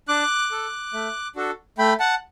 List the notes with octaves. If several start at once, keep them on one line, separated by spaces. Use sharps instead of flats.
D4 D6 F#6
A4
A3
D4 F#4 A4
A3 G5 B5
F#5 A5